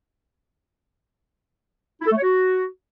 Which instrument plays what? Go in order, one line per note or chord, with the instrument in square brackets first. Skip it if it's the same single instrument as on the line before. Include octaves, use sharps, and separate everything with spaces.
[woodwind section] E4
A4
A3
C#5
F#4